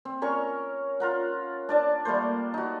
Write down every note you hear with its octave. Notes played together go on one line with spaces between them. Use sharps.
C4
C#4 A#4 C#5 C#6
F4 A#4 F#5
D4 D5 A5
G3 A3 A#3 C5
D#4 F#4